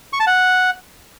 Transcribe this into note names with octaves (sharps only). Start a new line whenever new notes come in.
C#6
A5
F#5